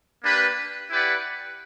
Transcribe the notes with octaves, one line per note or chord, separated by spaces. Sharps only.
A#3 D4 G4 B4
E4 G4 B4 D5 F#5